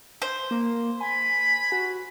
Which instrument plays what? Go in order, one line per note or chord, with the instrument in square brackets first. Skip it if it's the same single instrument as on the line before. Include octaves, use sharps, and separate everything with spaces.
[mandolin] C5
[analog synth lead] A#3
[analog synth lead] G#5 [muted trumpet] B5
[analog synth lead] F#4